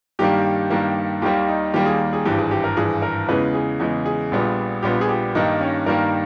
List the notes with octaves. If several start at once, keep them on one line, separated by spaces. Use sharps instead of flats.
G2 D#3 G3 A#3 G4
G2 D#3 G3 A#3
D#2 D#3 G3 A#3 G4
D#4
D#2 D#3 G3 A#3 G4
G#4
G#4
G#1 G2 E3 G4
G#4
G4
A#4
G#1 G2 E3 G#4
A#4
E2 C#3 E3 G#3 B4
G#4
E2 C#3 E3 G#3
G#4
A#1 A#2 G3 B3
A#1 A#2 G3 B3 G4
G#4
G4
G2 D#3 G3 A#3 D#4
C#4
G2 D#3 G3 A#3 A#4